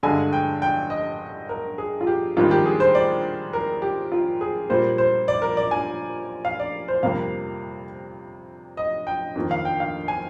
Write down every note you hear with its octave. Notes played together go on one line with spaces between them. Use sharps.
G2 D3 G#3 G#5
G5
G5
D#5
A#4
G#4
F4
G4
G#2 D#3 G3 A#3 F4
G4
G#4
C5
D5
A#4
G4
F4
G#4
A#2 G3 A#3 C5
C5
D5
A#4
D5
G#5
F5
D5
C5
F2 C3 G3 A#3 F5
D#5
G5
F2 D#3 A#3
F5
G5
F5
G#5